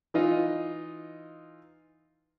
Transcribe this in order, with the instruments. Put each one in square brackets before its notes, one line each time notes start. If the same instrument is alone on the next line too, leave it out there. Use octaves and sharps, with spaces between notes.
[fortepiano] E3 D#4 F4 D#5